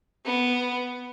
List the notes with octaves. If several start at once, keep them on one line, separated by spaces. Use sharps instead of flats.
B3